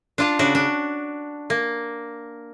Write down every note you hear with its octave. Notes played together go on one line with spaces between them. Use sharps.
D4 F4 A5
C#3 D4 F#4
D4
A#3